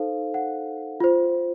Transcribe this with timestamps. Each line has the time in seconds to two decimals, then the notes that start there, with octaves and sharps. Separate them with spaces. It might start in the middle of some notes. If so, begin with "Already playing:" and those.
Already playing: D#4 A4 C5 F5
0.34 F#5
1.00 F4 C5